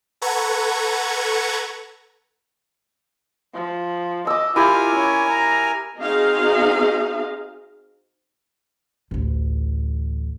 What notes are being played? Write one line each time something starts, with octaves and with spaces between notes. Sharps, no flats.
A4 B4 F#5 A#5 C#6 G#6
F3
D#5 D6 E6
E4 F4 G4 A#4 G#5
C#4
A#5
C4 D#4 F#4 G#4 D#5 F5
A1 D2